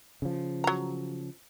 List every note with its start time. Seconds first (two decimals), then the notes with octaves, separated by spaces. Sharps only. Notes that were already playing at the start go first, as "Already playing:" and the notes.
0.22 C#3 F3
0.64 F#3 A#5